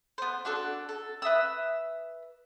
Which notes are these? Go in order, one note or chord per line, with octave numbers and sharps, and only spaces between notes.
B3 C5
D4 F#4 A4
A4
B4 E5 D#6 E6